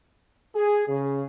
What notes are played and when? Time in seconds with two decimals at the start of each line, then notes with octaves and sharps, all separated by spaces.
0.55 G#4
0.88 C#3